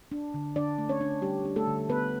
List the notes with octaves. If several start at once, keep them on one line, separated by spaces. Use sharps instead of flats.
D4
D3
D3 D4 D5
A3
C#4 C#5
D4
G3 G4
D4
A3 A4
D3
D3 B3 B4